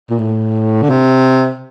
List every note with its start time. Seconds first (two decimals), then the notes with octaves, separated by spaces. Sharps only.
0.10 A#2
0.19 A2
0.82 D3
0.90 C3